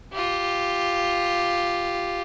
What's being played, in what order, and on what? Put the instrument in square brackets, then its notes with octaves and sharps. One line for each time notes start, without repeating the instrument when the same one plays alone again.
[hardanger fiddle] F4 G4